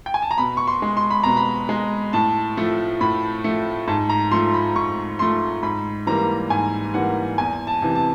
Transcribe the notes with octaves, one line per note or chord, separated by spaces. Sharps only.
G5
G#5
A5
A#5
B2 B5
C#6
C6
G#3
C6
B5
B2 A#5
B5
G#3
A2 A5
F3 A3
A2 B5
F3 A3
G#2 A5
A#5
F3 A3 C6
B5
G#2 C#6
F3 A3 C6
G#2 B5
E3 G3 A#3 A#5
G#2 G#5
E3 G3 A#3 F#5
E2 G#5
A5
C3 E3
A5